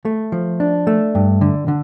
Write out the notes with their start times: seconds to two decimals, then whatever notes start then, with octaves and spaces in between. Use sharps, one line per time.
0.05 A3
0.32 F3
0.60 D4
0.87 A3
1.15 G2
1.41 D3
1.68 D3